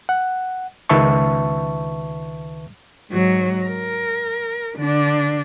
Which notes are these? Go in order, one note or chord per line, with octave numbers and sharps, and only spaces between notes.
F#5
C#2 D#3 B4 E5 A5 C#6
G#2 F#3
A#4
D3 D4